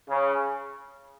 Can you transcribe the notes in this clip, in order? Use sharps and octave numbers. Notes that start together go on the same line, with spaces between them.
C#3